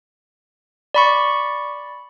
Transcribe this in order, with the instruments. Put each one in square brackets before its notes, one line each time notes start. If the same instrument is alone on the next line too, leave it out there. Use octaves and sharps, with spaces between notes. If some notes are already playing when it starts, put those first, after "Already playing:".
[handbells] D5 B5 C#6